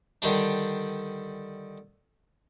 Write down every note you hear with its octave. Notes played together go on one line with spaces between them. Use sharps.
D3 D#3 G3 D4